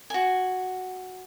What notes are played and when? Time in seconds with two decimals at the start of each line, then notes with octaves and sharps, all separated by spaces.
0.10 F#4 G#5